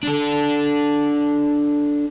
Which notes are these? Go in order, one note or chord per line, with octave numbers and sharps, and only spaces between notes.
D4 A4